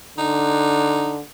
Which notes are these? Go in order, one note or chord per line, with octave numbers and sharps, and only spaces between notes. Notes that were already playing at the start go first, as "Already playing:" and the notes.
D3 D#4